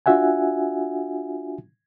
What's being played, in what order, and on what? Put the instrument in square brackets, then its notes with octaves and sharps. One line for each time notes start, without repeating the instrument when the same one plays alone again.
[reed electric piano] D4 F4 F#4 E5 F#5 G#5